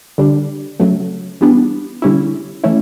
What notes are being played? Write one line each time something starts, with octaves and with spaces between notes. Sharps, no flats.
D3 G3 D4
C#3 F#3 A3
E3 G3 B3 D4
D3 G3 C#4 E4
E3 A3 C#4 E4